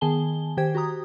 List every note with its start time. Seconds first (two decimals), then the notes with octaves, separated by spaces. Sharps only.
0.01 D#3 B3 G#4 G#5 A5 G7
0.57 D#3 G4 C5 G5 G#6
0.75 F#4 G4 A#5 D#6